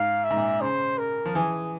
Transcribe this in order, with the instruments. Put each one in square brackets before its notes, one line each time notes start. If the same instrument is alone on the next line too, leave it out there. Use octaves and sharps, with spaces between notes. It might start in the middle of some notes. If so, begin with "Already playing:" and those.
Already playing: [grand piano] G#2 [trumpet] F5
[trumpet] E5
[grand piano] G#2
A#2
[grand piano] C#3 [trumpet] C5
[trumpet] A#4
[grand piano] F3
[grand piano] E3 [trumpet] G#4